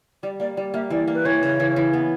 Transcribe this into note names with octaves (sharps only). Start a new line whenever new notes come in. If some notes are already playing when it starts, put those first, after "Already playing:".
G3 D5
A#3 D5
G3 D5
A#3 E5
E3 D5
A#3
B4
E3 C#5
C#3
E3
E3
B3